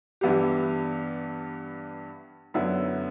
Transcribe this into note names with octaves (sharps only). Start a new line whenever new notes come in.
G2 E3 B3 E4 G4
F#2 D3 F#3 B3 E4